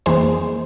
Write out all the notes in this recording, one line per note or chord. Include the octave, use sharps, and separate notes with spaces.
F2 E3 A#3 G#4 C5